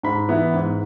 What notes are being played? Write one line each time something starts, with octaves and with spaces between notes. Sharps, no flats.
G#2 B5
E3 B3 E4
G#2